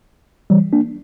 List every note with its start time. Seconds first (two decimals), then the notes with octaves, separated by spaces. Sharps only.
0.50 E3 G3
0.73 A#3 D4